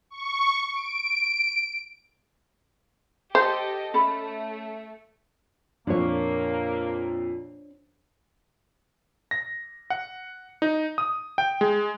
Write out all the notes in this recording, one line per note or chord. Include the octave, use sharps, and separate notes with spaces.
C#6
D7
G4 A4 C5 D#5
A3 C#4 A4 B5
F2 A#2 A#3 D4 C#5
A#6
F#5
D#4
D#6
G5
G#3